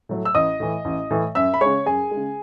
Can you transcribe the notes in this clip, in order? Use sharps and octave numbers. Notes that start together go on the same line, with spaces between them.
A2 F#3 A3
E6
A1 D#5 D#6
A2 E3
A1
A2 E3
F#2 E5 E6
B5
C#3 G#3 C#5 C#6
F#2 G#4 G#5
G#3
C#3